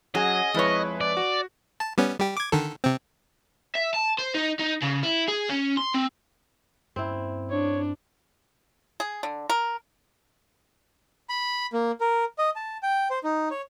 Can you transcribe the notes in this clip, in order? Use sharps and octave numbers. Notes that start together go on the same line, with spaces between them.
F#3 C#4 G#4 D#5 G#5
F2 G#3 E4 B4 C#5
D5
F#4
A5
G3 B3 C#4
G3 G4
D6 G#6
D3 D#3 A4
C3 C4
E5
A5
C5
D#4
D#4
C#3
E4
G#4
C#4
C6
C4
G2 A#3 C4 C#4 E4
D4 C#5
G#4
D3
A#4
B5
A#3
A#4
D#5
A5
G5
C5
D#4
C#5